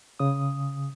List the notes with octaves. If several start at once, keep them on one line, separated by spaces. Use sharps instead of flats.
C#3 D#6